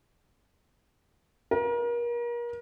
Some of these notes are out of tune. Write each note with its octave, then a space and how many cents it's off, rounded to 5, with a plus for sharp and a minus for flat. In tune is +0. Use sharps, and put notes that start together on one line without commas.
A#4 +35